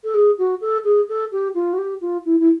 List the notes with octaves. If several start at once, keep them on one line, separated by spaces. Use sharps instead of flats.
A4
G#4
F#4
A4
G#4
A4
G4
F4
F#4
G4
F4
E4
E4